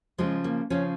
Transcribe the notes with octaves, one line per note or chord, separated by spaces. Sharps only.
C#3 F3 G#3
A#3
C#3 F3 C#4